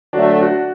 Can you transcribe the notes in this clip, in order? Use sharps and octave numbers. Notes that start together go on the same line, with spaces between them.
D3 F#3 A3 D4 F#4
D4 F#4